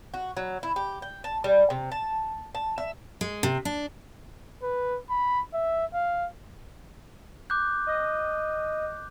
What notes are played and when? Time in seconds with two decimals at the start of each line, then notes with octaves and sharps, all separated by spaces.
0.14 F#4
0.37 F#3
0.63 E4
0.76 G4
1.02 G5
1.24 A5
1.44 G3
1.70 C3
1.92 A5
2.55 A5
2.78 E5
3.21 G#3
3.43 C3
3.65 D4
4.63 B4
5.10 B5
5.54 E5
5.94 F5
7.50 D6 F#6 G6
7.87 D#5